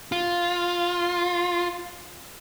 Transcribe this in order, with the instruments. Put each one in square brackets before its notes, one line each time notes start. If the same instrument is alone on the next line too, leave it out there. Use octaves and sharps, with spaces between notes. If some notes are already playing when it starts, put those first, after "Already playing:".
[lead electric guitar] F4